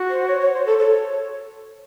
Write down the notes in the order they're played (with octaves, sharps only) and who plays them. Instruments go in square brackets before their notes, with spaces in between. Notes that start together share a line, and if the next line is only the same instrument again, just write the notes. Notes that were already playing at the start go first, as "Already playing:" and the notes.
Already playing: [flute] F#4
[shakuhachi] C5
C#5
C#5
C5
A4
[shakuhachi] A4 [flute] C#5